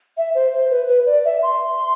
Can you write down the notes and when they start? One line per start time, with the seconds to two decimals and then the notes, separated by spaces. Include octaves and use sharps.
0.17 E5
0.35 C5
0.52 C5
0.70 B4
0.88 B4
1.06 D5
1.25 E5
1.43 C6